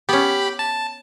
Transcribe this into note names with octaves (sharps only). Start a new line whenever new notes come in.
B3 C#4 G4 B5
A5